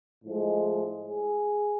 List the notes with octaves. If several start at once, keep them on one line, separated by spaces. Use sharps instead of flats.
A2 F3 G#3
G#4